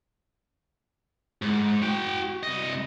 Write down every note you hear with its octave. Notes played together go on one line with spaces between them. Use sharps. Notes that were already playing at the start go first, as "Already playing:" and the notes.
G#2
F#4 G5
C2 D#5